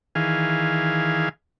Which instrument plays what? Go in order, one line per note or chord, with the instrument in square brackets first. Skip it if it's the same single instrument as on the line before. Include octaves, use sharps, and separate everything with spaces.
[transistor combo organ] D#3 E3 G#4 F5